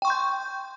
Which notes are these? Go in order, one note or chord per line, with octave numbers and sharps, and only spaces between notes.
G5 C6 C#6 G6